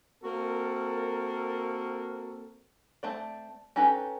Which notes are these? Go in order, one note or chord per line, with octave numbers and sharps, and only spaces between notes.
A#3 C4 F#4 A4 A#4
A3 C4 D5
C#4 D#4 G4 A4 B4